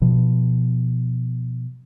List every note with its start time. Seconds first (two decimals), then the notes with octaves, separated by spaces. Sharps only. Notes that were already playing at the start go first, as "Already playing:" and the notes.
0.02 B2 F3